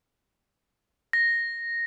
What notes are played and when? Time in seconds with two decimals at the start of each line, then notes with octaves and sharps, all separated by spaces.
1.13 A#6